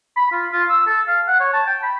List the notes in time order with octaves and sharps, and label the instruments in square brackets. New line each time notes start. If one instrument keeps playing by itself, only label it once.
[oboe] B5
F4
F4
E6
A4
F5
F#5
C#5
A5
G5
B5